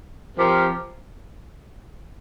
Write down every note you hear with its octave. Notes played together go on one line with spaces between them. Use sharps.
F3 C4 G4 A#4